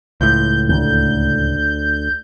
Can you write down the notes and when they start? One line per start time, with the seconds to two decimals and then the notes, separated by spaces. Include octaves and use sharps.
0.21 C#2 A2 G6
0.69 D2 G6